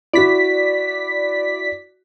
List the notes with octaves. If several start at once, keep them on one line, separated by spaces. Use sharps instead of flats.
E4 F#4 D5 B6